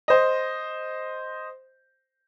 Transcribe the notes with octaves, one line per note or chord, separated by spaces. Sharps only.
C5 D#5